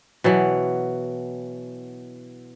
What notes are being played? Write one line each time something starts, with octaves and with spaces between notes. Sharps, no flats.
B2 E3 F#3